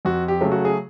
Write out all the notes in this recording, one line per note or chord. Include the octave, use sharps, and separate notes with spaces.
F2 F#4
G4
C#3 F#3 A3
F#4
G#4